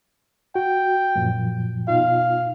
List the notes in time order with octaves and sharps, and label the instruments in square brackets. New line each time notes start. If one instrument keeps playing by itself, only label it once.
[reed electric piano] F#4 [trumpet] G5
[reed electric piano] F#2 A#2 F3
[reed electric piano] B2 D#4 F4 [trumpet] F5